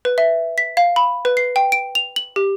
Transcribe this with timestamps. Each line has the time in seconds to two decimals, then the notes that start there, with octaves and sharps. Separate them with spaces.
0.05 B4
0.18 E5
0.58 B6
0.77 F5
0.96 B5
1.25 B4
1.37 C7
1.56 G5
1.72 D7
1.95 F7
2.16 F#7
2.36 G4